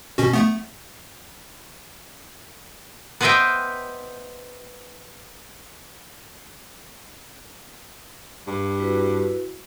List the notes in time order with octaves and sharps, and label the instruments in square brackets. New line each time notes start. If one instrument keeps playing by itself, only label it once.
[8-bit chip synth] B2 C#4 F#4
A3 B3
[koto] B3 B4 C5 D#5 E5 G5
[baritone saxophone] G2
[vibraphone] E4 F#4 B4